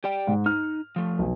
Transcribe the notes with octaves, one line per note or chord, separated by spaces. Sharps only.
G4 D5 G5
G#2
D#4 F6
F3 A3
B1